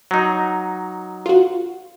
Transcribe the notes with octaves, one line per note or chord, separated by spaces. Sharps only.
F#3 D#4
F4 F#4